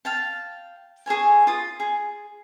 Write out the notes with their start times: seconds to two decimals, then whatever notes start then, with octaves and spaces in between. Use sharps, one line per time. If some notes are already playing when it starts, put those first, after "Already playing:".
0.05 F5 G5 A5
1.06 G#4 A4 C#5 G#5
1.47 F4 D#6
1.80 G#4